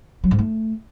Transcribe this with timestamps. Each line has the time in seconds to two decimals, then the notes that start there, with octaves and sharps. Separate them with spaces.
0.24 F#3
0.31 G#2
0.39 A3